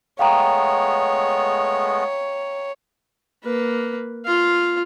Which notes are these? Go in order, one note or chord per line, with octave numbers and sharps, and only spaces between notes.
G#3 A3 B3 C#5 F5 G5 A#5
A#3 B4
F4 F5